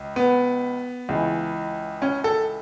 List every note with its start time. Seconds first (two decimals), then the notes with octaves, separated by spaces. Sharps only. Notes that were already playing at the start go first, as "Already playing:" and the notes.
Already playing: C#2
0.16 B3
1.09 C#2 C#3 E3
2.02 C#4
2.24 A4